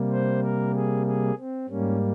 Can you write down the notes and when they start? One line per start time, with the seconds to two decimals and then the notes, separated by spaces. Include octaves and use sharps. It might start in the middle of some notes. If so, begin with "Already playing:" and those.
Already playing: C3 G3 A#3
0.12 C5
0.43 A#4
0.75 G#4
1.06 G#4
1.38 C4
1.69 G#2 G3 A#3 C#4